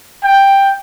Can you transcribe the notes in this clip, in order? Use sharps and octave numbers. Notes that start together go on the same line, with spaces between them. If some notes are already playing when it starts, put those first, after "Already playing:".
G5